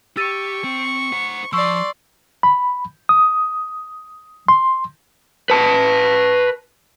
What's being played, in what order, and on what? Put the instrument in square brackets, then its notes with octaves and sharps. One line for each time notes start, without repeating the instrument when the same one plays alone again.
[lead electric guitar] G4 [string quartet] C#6 [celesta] E6 A6 D#7
[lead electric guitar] C4
C5 F#5
[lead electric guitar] F3 [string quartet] D5 C6 [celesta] C#6 E6
[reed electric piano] B5
D#6
C6
[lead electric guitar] B4 A5